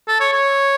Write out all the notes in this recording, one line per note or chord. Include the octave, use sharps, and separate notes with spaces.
A4
C#5
C#5